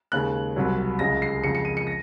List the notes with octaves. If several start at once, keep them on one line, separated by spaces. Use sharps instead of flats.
D#2 C#3 G#3 F#6
C2 C3 F#3
C#2 C#3 G#3 A#6
C7
F2 C#3 G#3 C#7
C#7
D#7
C#7
A#6